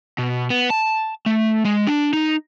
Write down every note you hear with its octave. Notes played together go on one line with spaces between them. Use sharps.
B2
B3
A5
A3
G#3
D4
D#4